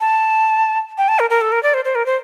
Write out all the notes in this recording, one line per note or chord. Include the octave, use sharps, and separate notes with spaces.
A5
G5
A5
A#4
A#4
A4
A#4
D5
C5
C5
A#4
C5